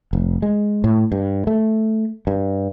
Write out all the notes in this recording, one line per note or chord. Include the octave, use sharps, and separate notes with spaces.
F1
G#3
A2
G2
A3
G2